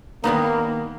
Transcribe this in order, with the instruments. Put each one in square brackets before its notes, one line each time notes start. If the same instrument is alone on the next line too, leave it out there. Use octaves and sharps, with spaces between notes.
[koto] D#3 G3 B3 D#4 [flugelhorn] A#3